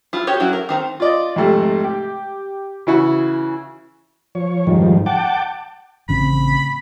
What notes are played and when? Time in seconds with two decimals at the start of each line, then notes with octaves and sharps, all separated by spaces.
0.13 E4 F4
0.27 F#4 G4 C#5
0.40 F#3 C#4 E4 F#4
0.53 A#4
0.69 D#3 C4 A#5
1.00 F4 D5 D#5
1.36 F2 G#2 C3 A3
1.84 G4
2.87 C#3 E3 E4 F#4
4.35 F3 C#5
4.67 F2 G#2 D#3 F3 G3
5.06 F#5 G5 A5 D6
6.09 A1 C#3 C4 B5